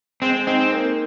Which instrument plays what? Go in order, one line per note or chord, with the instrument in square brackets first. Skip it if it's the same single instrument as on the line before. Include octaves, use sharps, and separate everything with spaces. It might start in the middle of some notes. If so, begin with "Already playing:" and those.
[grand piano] G#3 [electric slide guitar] C4
[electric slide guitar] C4 [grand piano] D#4
[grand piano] A#3